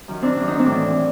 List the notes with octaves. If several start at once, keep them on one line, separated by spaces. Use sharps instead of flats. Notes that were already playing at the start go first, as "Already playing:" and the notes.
F#2 D#3
C4 D4
F#2 D#3 D4
D#4
C4 D4
A2 E3
A2